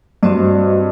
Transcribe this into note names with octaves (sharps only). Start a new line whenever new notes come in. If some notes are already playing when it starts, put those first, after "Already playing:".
G2 C4 F#4 C5 D#5